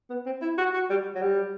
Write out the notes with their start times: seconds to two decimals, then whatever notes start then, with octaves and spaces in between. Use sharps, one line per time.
0.10 B3
0.26 C4
0.42 E4
0.58 F#4
0.74 F#4
0.90 G3
1.15 F#3
1.22 G3